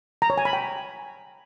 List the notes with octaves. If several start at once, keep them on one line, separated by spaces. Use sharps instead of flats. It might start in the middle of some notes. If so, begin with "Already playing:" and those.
A#5
C#5
G#5
B5
G5